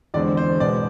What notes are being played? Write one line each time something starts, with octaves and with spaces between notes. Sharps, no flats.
E2 D3 G#3 C4 D5
C5
B2 G#3 B3 D5